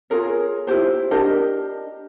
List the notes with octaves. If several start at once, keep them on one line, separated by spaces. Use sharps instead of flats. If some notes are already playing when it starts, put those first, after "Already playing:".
F4 G#4 A#4 C#5
E4 F4 G4 C5
D4 G4 A#4 D#5